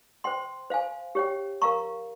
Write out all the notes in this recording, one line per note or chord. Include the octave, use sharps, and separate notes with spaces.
C5 G5 C6
C5 F5 G#5
G4 C#5 G5
A#4 F5 A#5 C#6